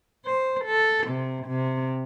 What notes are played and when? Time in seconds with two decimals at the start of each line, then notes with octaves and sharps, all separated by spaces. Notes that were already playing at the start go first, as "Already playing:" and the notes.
0.24 C5
0.65 A4
1.07 C3
1.47 C3